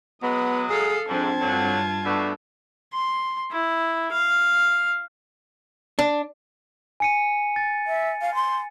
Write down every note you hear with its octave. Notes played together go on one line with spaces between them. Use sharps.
F#3 G#3 B3 D#6
G#4 A4 F5
G#2 F3 C4 D4 A5 G#6
G2 D3 F#3 F4
B2 A3 D4
C6
E4
F5
D4
G#5 C#7 D#7
A6
E5
F5
C6